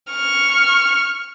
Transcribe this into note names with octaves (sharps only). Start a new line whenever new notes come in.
C#6 F6